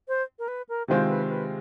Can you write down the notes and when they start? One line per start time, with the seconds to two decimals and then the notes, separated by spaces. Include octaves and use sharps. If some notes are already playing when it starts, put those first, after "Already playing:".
0.08 C5
0.39 A#4
0.48 B4
0.69 A#4
0.88 C3 D#3 G#3 C4 F4 C5
1.09 B4
1.29 B4